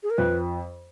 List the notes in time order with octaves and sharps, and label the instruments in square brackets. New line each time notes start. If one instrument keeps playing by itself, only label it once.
[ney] G#4
A#4
[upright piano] F2 [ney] B4